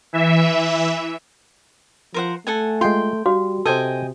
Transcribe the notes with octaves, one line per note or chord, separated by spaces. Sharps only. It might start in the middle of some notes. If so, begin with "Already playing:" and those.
E3 E5
F3 A#4 C5 F#5
A3 A4 F#5 G#5
G#3 F4 G5 C6
G3 F#4 F5
C3 A4 C5 D#5 G5 G#5